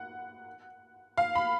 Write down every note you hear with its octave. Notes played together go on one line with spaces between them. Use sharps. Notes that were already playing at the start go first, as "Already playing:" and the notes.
Already playing: F#5
F5
B5